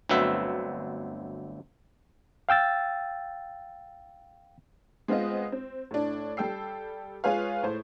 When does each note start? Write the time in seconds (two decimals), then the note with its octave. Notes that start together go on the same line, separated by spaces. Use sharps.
0.09 G1 D2 F#3 C4 B4 E5
2.49 F5 G5 E6 A6
5.08 G#3 B3 C4 F4 D#5
5.52 C4
5.91 A2 D4
6.37 G3 A4 G5 E6 C7
7.24 G#3 F4 G#4 B4 C#5 F5
7.63 A2 C5